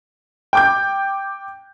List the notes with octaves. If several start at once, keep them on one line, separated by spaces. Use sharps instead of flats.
G5 D6 G6